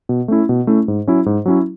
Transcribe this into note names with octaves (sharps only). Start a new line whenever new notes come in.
B2
A3 C#4 E4
B2
A3 C#4 E4
G#2
F#3 C#4 E4
G#2
F#3 C#4 E4